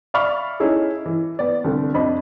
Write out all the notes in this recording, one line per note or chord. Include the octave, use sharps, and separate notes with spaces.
D5 E5 F5 B5 C#6 F6
C#4 D#4 E4 G#4 A4
E3
B3 D5
C2 D3
F2 D4 C5 D#5 B5